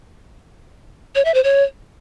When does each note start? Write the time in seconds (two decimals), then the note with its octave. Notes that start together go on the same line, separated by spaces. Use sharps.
1.15 C#5
1.25 E5
1.34 C5
1.44 C#5